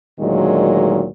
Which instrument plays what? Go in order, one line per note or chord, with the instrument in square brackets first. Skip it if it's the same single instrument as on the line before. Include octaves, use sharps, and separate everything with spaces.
[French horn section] D2 A#2 D#3 F#3 G#3